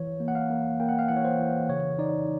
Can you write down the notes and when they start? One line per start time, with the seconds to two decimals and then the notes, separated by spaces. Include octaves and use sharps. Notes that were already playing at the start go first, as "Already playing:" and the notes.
Already playing: E3 C#5
0.20 A#3
0.28 F#5
0.35 F5
0.50 A#3
0.80 A#3 G5
0.89 F#5
0.99 F5
1.08 E3 F#5
1.16 C#5
1.25 C5
1.39 E3
1.69 C#3 C#5
1.99 D#4 D5